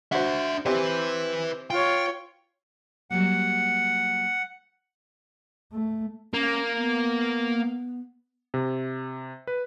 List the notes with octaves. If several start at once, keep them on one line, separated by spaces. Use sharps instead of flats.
D4 F#4 C5 E5
C4 E4 G4 B4 C5
F4 C#5 G5
F#3 G3 A#3 F#5
A3
A#3 C#4
B3
C3
B4